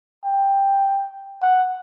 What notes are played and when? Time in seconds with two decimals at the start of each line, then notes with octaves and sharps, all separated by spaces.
0.24 G5
1.43 F#5